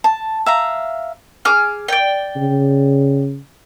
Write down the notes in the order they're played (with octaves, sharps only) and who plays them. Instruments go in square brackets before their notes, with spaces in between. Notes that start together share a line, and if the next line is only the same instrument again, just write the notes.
[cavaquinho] A5
E5 F5 A#5
[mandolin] G#4 D6 F6
D5 G5
[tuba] C#3